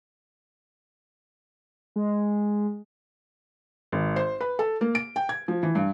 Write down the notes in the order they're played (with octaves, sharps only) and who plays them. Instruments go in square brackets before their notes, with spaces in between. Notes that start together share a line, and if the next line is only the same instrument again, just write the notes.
[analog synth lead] G#3
[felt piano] G#1
C5
B4
A4
A#3
D7
G5
G#6
F3
E3
G2